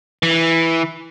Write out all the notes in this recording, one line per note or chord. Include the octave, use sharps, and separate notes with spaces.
E3